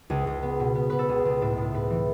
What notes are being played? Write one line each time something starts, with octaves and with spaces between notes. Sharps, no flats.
C#2 G#4
C#2
B3
B2
B3
B2 B4
A4
C#2 G#4
C#2
A2 A4
A2
A2 B4
E3